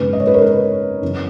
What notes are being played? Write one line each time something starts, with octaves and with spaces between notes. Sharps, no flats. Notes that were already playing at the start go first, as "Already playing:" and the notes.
Already playing: G#1 F#2 C#3 G#3 B3 B4
D#5
C#5
B4
A#4 C#5
B4
F#2 C#3 E3 B3